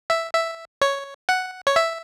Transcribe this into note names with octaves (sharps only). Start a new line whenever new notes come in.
E5
E5
C#5
F#5
C#5
E5